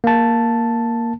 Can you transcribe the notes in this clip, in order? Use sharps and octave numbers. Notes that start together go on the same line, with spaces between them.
A#3 A5